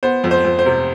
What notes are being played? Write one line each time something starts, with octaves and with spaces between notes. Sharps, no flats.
B3 C5
F2
C5
F2
C5
C3